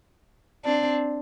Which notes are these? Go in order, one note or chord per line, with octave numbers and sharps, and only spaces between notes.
C4 D4